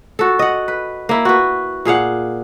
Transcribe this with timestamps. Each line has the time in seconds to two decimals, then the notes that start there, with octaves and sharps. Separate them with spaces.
0.19 F#4 A4
0.39 D#5 F#5
0.68 B4
1.09 A#3 E4
1.25 F#4 B4
1.85 A#2 G#4 F5 F#5